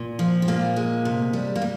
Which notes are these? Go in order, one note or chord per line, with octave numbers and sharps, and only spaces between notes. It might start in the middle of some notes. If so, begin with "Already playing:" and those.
Already playing: A#2
F3
C4
A#2 A#3
G#3
C3
G3
A#3
G3